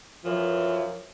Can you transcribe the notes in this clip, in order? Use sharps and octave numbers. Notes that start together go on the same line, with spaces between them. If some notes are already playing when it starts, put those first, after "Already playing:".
F#2 E3 F3